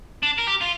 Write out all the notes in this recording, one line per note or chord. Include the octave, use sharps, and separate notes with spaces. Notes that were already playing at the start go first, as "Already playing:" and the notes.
D4
A#4
G4
F4